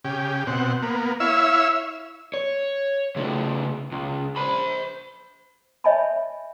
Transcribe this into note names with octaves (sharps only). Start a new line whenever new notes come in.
C#3 G4
B2 C4 F#5
A#3 B3
E4 C#5 E5 F5 E6
C#5
C#3 A3
C#2
C5 B5
C#5 D#5 E5 G#5 A5 B5